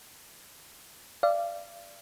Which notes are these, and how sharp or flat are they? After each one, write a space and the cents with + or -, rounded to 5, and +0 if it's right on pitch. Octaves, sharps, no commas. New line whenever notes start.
D5 +0 F5 -35